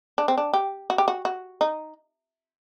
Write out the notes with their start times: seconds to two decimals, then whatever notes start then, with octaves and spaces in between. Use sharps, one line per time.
0.18 D4
0.28 C4
0.38 D4
0.53 G4
0.90 F#4
0.98 G4
1.08 F#4
1.25 F#4
1.61 D#4